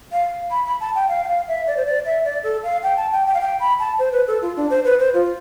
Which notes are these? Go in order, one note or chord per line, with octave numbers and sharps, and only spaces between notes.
F5
B5
B5
A5
G5
F5
G5
F5
E5
D5
C5
D5
E5
D5
A4
F5
G5
A5
G5
G5
F5
G5
B5
A5
C5
B4
A4
F4
D4
C5
B4
C5
F4